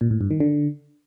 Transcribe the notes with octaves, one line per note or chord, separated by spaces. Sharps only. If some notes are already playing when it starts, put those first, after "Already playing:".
A#2
A2
G2
D#3
D3